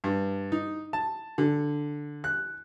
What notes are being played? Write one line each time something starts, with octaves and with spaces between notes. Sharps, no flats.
G2
D#4
A5
D3
F#6